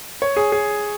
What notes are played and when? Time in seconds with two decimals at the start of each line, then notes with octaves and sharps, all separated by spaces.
0.22 C#5
0.37 G#4
0.52 G#4